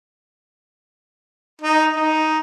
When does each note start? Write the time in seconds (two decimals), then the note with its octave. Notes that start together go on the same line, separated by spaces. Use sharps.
1.62 D#4
1.96 D#4